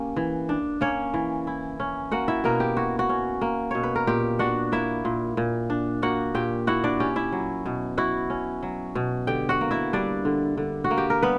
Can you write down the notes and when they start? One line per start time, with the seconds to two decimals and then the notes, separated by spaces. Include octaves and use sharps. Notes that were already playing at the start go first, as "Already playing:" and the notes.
Already playing: A#3 C#4 G4
0.16 E3
0.49 D4
0.81 A#3 C#4 C#5
1.14 E3
1.47 E4
1.80 C#4
2.11 A#3 F#4 F#5
2.28 E4 E5
2.44 B2 A#3 A#4
2.60 G4
2.77 E4 F#4
2.99 F#4
3.09 C#4
3.41 A#3
3.71 B2 C#5
3.83 B4
3.96 A#4
4.07 A#2 G4
4.39 D4 F#4 F#5
4.72 A#3 E4 E5
5.05 A#2
5.37 A#2
5.70 D4
6.02 A#3 F#4 F#5
6.35 A#2 G4 G5
6.67 E4 F#4 F#5
6.84 D4 D5
7.00 C#4 G4
7.16 E4 E5
7.32 F#3
7.65 B2
7.98 E4 F#4 F#5
8.30 C#4
8.63 F#3
8.95 B2
9.27 D3 G4 G5
9.49 F#4 F#5
9.61 A#3
9.71 E4 E5
9.93 G3 D4 D5
10.25 D3
10.57 D3
10.84 F#4
10.91 A#3
10.97 G4
11.10 A#4
11.22 G3 B3 B4